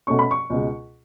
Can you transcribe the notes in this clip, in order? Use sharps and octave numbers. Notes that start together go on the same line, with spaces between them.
B2 A3 C#4 C#6
B5
C#6
C#2 B2 G#3